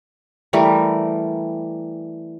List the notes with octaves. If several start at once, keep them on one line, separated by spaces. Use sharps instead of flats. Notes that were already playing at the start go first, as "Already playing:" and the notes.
E3 G3 A3 A#4